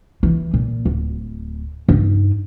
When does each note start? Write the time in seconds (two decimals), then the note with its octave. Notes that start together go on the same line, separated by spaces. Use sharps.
0.23 E3
0.54 A#2
0.85 D1
1.89 G2 D#4